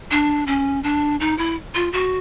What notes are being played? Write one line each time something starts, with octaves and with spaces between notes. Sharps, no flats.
D4
C#4
D4
D#4
E4
F4
F#4